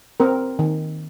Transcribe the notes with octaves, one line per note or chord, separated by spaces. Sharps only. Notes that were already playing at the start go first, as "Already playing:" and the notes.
C4 A#4
D#3